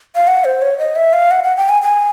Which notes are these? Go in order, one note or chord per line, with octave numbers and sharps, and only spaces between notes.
F5
F#5
C5
C#5
D#5
E5
F5
F#5
F#5
G5
G#5
G#5